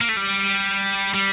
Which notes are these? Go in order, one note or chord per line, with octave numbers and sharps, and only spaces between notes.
A#3
A3
G3
G3